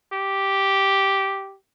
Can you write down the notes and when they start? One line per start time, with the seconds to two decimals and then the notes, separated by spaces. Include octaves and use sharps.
0.13 G4